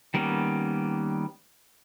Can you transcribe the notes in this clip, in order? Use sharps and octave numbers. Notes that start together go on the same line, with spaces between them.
D#3 G3 A#3 B3 C#4